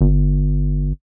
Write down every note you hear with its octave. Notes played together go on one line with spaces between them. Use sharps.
G1